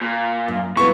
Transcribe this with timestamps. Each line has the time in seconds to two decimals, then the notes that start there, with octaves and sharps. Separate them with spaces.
0.01 A#2
0.48 F#2
0.77 E3 F#3 B3 F4 C#6